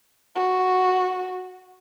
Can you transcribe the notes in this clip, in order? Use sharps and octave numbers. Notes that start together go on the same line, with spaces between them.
F#4